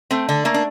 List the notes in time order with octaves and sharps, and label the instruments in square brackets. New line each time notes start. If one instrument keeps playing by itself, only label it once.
[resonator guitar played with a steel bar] A3 C4
D3 D4
A3 A#3
D4